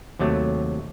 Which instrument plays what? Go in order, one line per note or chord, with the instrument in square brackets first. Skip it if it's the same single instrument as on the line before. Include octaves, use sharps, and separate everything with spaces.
[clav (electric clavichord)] D#2 C3 F#3 A3